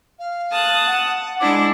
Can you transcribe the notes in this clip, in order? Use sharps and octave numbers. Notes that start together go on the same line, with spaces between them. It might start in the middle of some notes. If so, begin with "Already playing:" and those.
F5
A5 D#6 F#6
F#5
G#3 D4 E4 D6